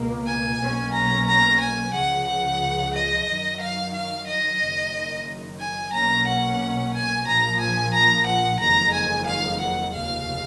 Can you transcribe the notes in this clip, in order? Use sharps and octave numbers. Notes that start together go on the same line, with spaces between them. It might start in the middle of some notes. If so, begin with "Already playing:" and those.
Already playing: C#2 B2 A#3
G#5
B1 B2 A#3 C#4
A#5
A#5
G#5
C#2 C#3 F3 F#5
F#5
D#5
F#2 D#3 F#3
F5
F5
D#5
F#1 F#2 D#3
G#5
B1 B2 A#3 C#4 A#5
F#5
G#5
A#1 A#2 F3 A#5
G#5
A#5
F#5
F#1 F2 D#3 G#3 A#5
G#5
F5
F#5
F1 D#2 C#3 F5